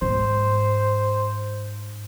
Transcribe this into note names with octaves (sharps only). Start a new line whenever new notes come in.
G#2 C5